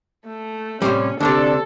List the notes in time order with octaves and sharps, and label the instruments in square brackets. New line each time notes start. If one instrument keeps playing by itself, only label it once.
[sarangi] A3
[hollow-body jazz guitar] A2 C3 G3 [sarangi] C#4
[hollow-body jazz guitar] D2 A2 C3 [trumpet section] D4 [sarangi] A4